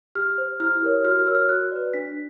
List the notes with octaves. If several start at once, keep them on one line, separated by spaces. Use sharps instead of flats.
G4 F6
C5
E4 F6
G4 A#4 C#5
F#4 F6
F6
A#4 C#5 E6
F6
F#4 F#6
B4 D5
D4 B6